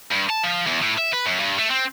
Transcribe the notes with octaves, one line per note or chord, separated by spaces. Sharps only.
G2
A5
F3
E2
A2
E5
B4
F#2
G2
A3
C4